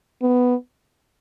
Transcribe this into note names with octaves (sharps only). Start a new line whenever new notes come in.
B3